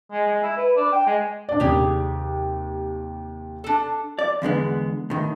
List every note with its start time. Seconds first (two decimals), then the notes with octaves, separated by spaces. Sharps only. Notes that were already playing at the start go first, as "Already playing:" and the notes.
0.12 G#3
0.27 G#3
0.43 E4
0.57 B4
0.76 D4
0.92 G5
1.06 G#3
1.49 D4 D5
1.60 D#2 C3 G4 G#4
3.64 D4 A4
4.19 D5
4.42 E2 D3 G#3 B3
5.10 A2 D#3